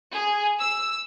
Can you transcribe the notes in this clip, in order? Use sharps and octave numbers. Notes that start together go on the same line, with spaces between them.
G#4
E6